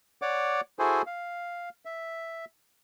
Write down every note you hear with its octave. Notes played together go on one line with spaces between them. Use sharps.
C#5 D5 F#5 D6
E4 F#4 G#4 A4 C5 G#5
F5
E5